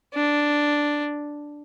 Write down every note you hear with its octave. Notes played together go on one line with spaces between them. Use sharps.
D4